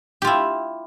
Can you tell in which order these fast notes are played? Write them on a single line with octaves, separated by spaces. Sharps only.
G4 F4 E4